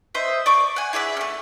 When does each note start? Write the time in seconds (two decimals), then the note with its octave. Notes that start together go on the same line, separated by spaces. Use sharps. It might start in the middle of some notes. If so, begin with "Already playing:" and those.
0.15 C5 D#5 E5
0.46 D5 C#6 D6
0.76 F#5 G#5
0.93 E4 G#4 D5 E5
1.17 A3 C#4